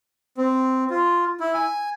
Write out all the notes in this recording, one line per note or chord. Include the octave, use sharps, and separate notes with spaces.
C4
F4
E4
G#5